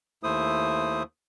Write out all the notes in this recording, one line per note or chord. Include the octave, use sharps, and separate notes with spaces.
D#2 A3 E4 C5 D#6